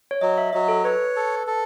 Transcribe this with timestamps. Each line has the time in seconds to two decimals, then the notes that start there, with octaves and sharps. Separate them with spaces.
0.11 C#5
0.21 F#3 D#5
0.38 E5
0.53 F#3 D#5
0.68 A4
0.84 B4 C#5
1.16 A4
1.47 A4